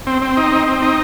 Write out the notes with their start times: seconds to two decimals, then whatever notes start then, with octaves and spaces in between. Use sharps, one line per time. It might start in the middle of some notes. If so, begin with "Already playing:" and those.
0.07 C4
0.22 C4
0.37 D#4
0.52 C4
0.67 C4
0.82 D#4